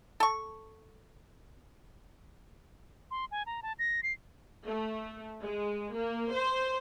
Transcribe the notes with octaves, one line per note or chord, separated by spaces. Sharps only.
A4 C#6
C6
G#5
A#5
A5
A#6
C7
A3
G#3
A#3
C5